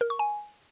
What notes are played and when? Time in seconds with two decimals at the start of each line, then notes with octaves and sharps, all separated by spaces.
0.01 A#4
0.10 C#6
0.19 G#5